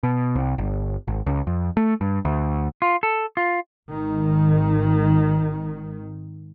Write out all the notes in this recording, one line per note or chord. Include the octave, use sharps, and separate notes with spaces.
B2
C2
G1
G#1
C#2
F2
A3
G2
D2
F4
A4
F4
G#1 D#3